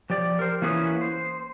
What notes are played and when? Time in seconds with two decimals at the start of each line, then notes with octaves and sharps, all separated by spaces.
0.10 F3 G4 D5
0.39 A#4 C5
0.62 E3 A#3 C#4 F#4 G#4 B4
1.01 C5